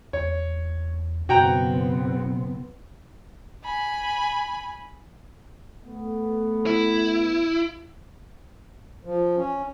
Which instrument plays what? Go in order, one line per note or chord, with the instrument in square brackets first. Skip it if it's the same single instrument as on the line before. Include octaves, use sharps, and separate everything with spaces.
[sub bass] E2 [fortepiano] C#5
[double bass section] F#1 B3 C4 [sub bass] B2 [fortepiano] F#4 G5 A#5
[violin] G#5 B5
[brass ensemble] A3 B3
[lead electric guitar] E4
[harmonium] F3
C#4